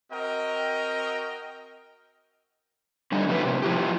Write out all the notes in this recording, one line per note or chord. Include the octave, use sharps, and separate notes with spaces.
C4 F#4 A#4 D#5 G5
D3 G3 D#4
B2 F3 F#3 A3 B4
A2 C3
F3 E4 G4